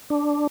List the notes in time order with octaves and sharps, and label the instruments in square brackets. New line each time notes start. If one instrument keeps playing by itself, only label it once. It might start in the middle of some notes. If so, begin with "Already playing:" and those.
[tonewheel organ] D4